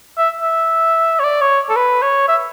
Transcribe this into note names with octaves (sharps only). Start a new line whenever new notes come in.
E5
E5
C#5
D5
C#5
A4
B4
C#5
E5